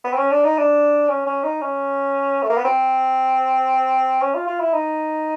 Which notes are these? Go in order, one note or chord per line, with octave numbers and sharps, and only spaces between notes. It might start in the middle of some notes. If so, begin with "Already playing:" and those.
B3
C4
C#4
D4
D#4
D4
C#4
C#4
D#4
C#4
A3
A#3
B3
C4
C#4
F4
F4
E4
D#4